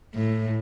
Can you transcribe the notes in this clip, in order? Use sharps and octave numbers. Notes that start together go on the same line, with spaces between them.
A2